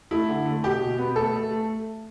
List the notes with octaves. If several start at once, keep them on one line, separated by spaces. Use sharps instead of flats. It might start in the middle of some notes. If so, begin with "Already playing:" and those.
A3 E4
D3
A3
B2 G4
B2
B3
A3 A4
A3
A3